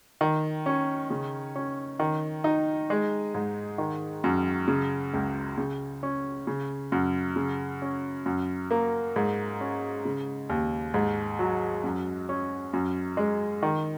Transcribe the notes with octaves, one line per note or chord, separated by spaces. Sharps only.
D#3
C#4
C#3
C#4
D#3
D#4
G#3
G#2
D#3
F#2
C#3
C#2
C#3
C#4
C#3
F#2
C#3
C#4
F#2
A#3
G#2
C#4
C#3
D#2
G#2
F#3
F#2
C#4
F#2
G#3
D#3